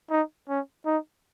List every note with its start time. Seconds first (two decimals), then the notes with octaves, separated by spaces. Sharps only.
0.11 D#4
0.49 C#4
0.86 D#4